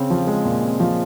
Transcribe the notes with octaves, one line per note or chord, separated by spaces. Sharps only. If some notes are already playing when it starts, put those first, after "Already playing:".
Already playing: C#3 C4
F3
G#3
A#2
C4
F3